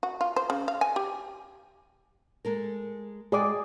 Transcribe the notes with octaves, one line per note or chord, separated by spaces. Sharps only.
F#4
F4
C5
C#3
F5
G#5
G4
G#3 A4 A#4
G#3 G#4 D5 G5 G#5 D6